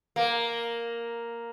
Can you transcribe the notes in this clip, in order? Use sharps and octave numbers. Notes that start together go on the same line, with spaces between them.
A#3